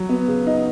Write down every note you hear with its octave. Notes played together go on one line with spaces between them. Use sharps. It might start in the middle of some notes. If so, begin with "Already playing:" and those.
Already playing: F#3
B3
C#3
D#4